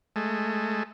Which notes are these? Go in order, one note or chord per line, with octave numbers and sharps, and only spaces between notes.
G#3 A3